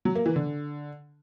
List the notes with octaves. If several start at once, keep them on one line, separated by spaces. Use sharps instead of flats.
F#3
A#3
E3
D3